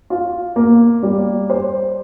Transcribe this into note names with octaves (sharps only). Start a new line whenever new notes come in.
F4
A#3
G3
C5